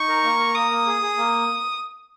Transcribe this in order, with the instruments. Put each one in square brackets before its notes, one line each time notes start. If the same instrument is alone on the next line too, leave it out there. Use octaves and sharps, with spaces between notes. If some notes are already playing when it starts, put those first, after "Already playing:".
Already playing: [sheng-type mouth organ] D#4 [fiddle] C#6
[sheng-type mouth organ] A#4
A#3
A#4
[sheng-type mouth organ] A#3 [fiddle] D#6
[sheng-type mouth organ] A#3
G#4
G#4
A#3